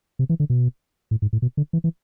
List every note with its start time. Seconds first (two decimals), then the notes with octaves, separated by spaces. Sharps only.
0.19 C3
0.29 E3
0.40 D3
0.50 B2
1.11 A2
1.22 G#2
1.33 A2
1.42 B2
1.57 D3
1.73 E3
1.84 E3